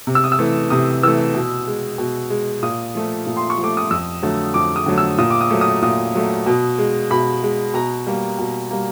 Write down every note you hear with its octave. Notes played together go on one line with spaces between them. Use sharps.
C3
E6
D#6
E6
E3 A3
C3 D#6
E3 A3 E6
B2
G#3
B2
G#3
A#2 D#6
F3 A3
A#2
C6
C#6
F3
A3 D6
D#6
F2 E6
D3 F#3 A3
F2 D6
D#6
D3 F#3 A3
E6
A#2 D#6
D6
D#6
F#3 A3
D#6
A#2 D#6
F#3 A3
B2
G#3
B2 B5
G#3
B2 A#5
G3 A#3
B2
G3 A#3